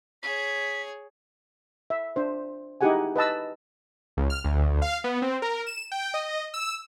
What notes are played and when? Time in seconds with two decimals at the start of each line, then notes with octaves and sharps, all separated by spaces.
0.23 G#4 C#5 B6
1.90 E5
2.16 D4 C5
2.81 D#4 E4 G4 G#4 F#5 G#5
3.16 B4 D#5 A5 E6
4.17 C#2
4.30 F6
4.44 D2
4.82 F5
5.04 B3
5.22 C4
5.42 A#4
5.67 E7
5.92 G5
6.14 D#5
6.54 E6